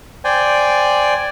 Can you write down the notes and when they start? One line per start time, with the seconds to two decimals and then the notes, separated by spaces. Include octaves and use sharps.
0.24 C5 D5 G5 G#5